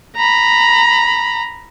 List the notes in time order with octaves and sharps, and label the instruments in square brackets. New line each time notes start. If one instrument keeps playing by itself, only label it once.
[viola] A#5 B5